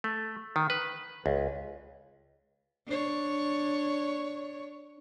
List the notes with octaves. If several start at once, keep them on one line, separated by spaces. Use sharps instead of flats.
A3
D#3
B4
C#2
D4 C#5